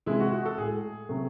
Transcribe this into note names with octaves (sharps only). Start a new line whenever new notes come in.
C3 E3 G#3 E4
F#4
F#4
A4
A2 G#3 G#4
C3 F#3 A3